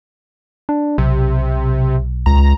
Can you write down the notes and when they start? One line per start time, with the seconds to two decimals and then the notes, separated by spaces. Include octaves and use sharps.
0.69 D4
0.98 B1 C3
2.26 C#2 A#5